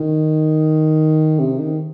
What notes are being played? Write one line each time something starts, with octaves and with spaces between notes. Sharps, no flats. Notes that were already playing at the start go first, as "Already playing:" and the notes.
Already playing: D#3
C3
D#3